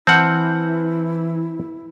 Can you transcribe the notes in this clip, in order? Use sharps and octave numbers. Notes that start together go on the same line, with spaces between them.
E3 C4 E4 F#5 A5 F6 G6